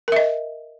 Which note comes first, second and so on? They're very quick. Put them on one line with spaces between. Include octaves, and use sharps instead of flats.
A#4 E5 D#5